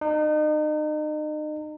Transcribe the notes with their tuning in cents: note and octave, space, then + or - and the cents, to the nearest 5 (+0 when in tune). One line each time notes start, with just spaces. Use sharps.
D#4 -35